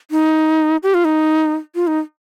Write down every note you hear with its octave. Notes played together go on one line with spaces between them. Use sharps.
D#4
G4
F4
D#4
F4
D#4